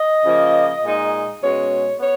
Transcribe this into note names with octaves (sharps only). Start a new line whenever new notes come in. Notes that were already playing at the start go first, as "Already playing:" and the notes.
Already playing: D#5
C#3 F3 A#3
A#2 G#3 D#4
B2 G#3 C#4 C#5
B3 C#5